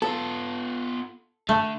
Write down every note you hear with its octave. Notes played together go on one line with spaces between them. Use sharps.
B3 F4 A4
D3 A3